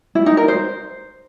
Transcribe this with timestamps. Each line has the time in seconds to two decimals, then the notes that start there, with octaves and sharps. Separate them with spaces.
0.15 E4
0.26 D#4
0.37 A#4
0.48 C5